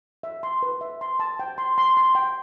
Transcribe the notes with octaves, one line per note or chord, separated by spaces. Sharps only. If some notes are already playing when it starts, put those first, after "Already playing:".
E5
C6
B4
E5
C6
A5
G5
C6
C6
C6
G5